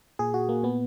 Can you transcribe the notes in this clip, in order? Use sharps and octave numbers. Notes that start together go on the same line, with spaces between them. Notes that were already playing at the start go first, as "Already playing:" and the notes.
A#2 G#4
F#4
A#3
A#2 B3